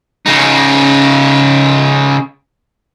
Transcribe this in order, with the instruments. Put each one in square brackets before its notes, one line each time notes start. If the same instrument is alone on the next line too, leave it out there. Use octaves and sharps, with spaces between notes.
[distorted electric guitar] C#3 D#4